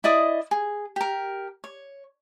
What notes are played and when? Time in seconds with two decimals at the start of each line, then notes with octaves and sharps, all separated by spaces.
0.04 E4 D5 D#5 D#6
0.51 G#4
0.96 G4 A#4
1.64 C#5